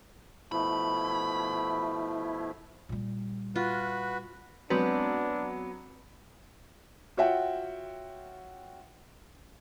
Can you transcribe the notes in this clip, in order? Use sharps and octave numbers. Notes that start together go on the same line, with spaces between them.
B2 F3 A3 E4 B5
A#2 G3
F4 F#4 B4
F#3 G#3 B3 C4 D4 B4
F4 F#4 C#5 E5 F#5 G5